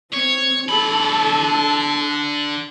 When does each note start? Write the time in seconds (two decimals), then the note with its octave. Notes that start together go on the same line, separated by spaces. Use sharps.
0.13 C4 C#5
0.69 D3 A4 B5